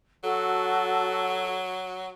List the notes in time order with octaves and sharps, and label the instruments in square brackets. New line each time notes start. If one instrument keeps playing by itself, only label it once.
[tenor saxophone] F#3 [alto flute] F#4 [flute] A4